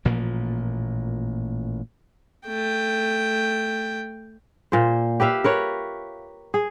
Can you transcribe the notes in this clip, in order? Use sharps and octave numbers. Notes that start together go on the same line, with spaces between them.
A1 A#2 F3 A#3
A3 G5
A#2 C5
G4 B4 E5 F5
A#4 B4 C#5
G#4